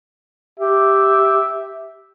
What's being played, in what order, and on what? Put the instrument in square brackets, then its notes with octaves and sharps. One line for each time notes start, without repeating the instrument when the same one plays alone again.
[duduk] G4 [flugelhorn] E5